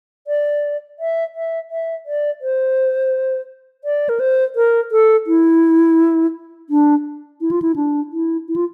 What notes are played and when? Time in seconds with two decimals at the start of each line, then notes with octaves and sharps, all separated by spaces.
0.27 D5
0.99 E5
1.35 E5
1.70 E5
2.06 D5
2.41 C5
3.84 D5
4.09 A#4
4.20 C5
4.56 A#4
4.92 A4
5.27 E4
6.70 D4
7.41 E4
7.51 F4
7.62 E4
7.76 D4
8.12 E4
8.48 E4
8.56 F4